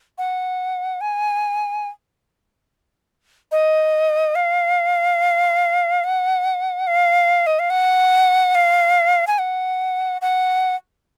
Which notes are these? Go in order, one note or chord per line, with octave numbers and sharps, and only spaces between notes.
F#5
G#5
D#5
F5
F#5
F5
D#5
F5
F#5
F5
G#5
F#5
F#5